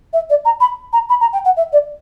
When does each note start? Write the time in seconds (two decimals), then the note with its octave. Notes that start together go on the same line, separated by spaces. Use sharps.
0.13 E5
0.30 D5
0.45 A#5
0.60 B5
0.93 A#5
1.09 B5
1.21 A#5
1.33 G5
1.45 F#5
1.56 E5
1.72 D5